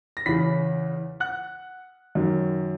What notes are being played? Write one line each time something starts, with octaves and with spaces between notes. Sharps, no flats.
A#6
E2 C#3 E3 B5 B6
F#5 F#6
F#2 D#3 F#3